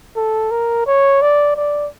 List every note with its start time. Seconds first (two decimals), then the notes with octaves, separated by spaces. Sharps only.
0.16 A4
0.51 A#4
0.86 C#5
1.21 D5
1.56 D5